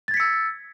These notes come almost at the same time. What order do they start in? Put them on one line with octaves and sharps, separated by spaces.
A6 G#6 B6 C#7 E6